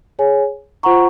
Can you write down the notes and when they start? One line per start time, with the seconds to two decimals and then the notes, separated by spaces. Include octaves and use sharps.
0.19 G#4 C#5 G#5
0.83 F4 C5 F#5 A#5 C#6